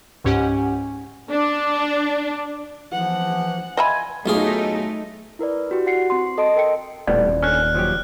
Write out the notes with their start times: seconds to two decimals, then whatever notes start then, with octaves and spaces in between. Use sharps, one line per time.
0.25 C#2 G#2 C#4 G4 F#5 G#5
1.30 D4
2.92 E3 F3 F#5
3.77 F4 D#5 E5 G#5 B5
4.26 B1 A3 D#4 F4 G#4
5.39 E4 A#4 B4 D5
5.70 E4 F#4 G4
5.86 F#4 F#5 C7 C#7
6.10 C4 C6
6.37 A4 D#5 A5 C6 D7
6.56 A4 A#4 G5 C#7
7.08 D#1 A2 G3 B3 D5
7.43 C#4 D4 A4 F6 F#6
7.75 F3 F#3 G4